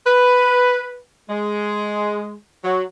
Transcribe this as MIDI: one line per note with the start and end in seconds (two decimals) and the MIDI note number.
0.07 1.00 71
1.30 2.38 56
2.64 2.83 54